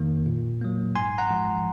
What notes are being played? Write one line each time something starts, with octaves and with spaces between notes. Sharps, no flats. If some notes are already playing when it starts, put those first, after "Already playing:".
Already playing: F2 D#3 A#3
A#2
F#3 A#3
G#2 G#5 C6
F#5 A#5
F3 G#3